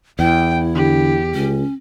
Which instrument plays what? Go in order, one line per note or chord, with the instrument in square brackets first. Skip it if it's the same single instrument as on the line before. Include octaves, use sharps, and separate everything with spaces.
[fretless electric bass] E2 [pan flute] E4 [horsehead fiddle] G5
[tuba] D3 [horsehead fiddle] G4
[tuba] C#2 [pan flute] C#4